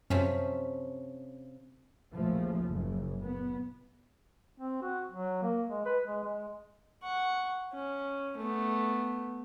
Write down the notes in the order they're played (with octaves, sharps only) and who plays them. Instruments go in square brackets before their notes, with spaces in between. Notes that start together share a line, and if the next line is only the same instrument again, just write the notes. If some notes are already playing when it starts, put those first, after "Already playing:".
[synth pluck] F#2 B6 [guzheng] C3 F3 C#4
[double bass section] A1 D#2 A#2 C#3 F3 A3
F#1 C#3
A#2 B3
[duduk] C4
F#4
F#3
A#3
G#3
B4
G#3
G#3
[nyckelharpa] F#5 C#6
C#4
A3 B3